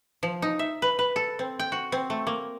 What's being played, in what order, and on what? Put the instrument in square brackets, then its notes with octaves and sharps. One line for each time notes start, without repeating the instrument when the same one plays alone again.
[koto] F3
D#4
E5
B4
B4
A4
C4
G5
F#4
C4
A3
A#3